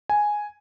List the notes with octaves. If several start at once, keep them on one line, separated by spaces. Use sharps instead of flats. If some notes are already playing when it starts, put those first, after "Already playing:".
G#5